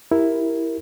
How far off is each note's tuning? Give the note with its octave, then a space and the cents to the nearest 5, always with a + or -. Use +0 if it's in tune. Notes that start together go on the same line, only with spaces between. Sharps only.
E4 +0 G4 +0 A#4 +0